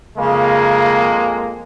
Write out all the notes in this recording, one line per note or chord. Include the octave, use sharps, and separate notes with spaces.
F2 C#3 G#3 A#3